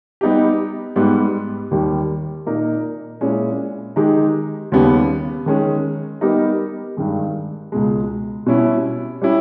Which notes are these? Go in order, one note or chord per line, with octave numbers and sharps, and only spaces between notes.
G3 B3 D#4 G4
G#2 G3 B3
D#2 D#3 G3
A#2 A#3 D#4 A#4
A#2 G#3 C#4 E4
D#3 G#3 D#4 G4
D#2 C#3 G3 B3
D#3 G#3 C#4
G3 B3 D#4 G4 A#4
G2 D#3 G#3
C#2 B2 G#3
B2 G3 C#4 E4
G3 C#4 E4